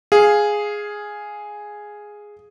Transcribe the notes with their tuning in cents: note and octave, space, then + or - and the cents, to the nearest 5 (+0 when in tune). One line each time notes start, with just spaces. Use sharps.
G#4 +0 F5 +0